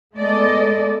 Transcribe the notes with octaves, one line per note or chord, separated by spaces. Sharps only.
G#3 A3 B3 A4 D5 D#5